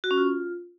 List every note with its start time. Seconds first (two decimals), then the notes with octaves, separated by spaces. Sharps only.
0.04 F#4
0.11 C#4
0.18 F4